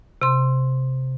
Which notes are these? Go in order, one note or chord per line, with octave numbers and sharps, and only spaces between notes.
C3 C6